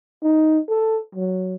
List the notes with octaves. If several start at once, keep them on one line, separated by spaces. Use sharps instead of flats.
D#4
A4
F#3